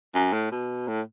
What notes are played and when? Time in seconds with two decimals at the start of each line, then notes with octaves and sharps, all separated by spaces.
0.14 F#2
0.33 A2
0.51 B2
0.87 A2